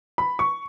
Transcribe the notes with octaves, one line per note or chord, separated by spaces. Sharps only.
B5
C#6